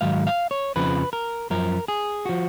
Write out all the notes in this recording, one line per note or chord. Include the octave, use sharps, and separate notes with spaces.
G#2 D#3 F#3 F5
F5
C#5
F2 C#3 F3 B4
A#4
F#2 F3 A#4
G#4
F3 F#4